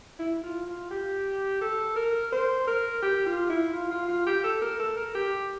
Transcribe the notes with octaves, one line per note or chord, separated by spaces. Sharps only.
E4
F4
F4
G4
A4
A#4
C5
A#4
G4
F4
E4
F4
F4
F4
G4
A4
A#4
A4
A#4
G4